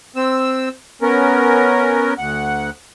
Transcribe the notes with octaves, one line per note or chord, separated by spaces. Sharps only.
C4 E6
B3 C#4 A#4
D2 F#5